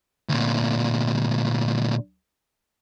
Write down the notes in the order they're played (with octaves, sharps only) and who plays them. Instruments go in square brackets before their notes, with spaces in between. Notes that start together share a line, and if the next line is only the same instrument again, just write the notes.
[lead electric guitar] D2 A#2